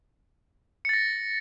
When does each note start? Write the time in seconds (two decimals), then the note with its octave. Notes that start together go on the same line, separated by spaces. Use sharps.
0.85 C#7
0.89 A6
0.93 A#6